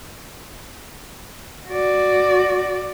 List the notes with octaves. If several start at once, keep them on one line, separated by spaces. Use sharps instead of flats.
F#4 D5